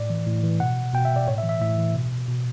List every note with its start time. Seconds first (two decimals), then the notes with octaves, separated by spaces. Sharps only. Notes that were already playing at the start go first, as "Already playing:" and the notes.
Already playing: A2 D5
0.10 E3
0.27 A2
0.43 E3
0.60 B2 F#5
0.94 B2 G5
1.05 E5
1.16 D5
1.27 A2 C#5
1.38 E5
1.44 E3
1.49 E5
1.61 A2 E5
1.78 E3
1.95 B2
2.28 B2